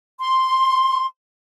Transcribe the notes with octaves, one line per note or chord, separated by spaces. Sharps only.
C6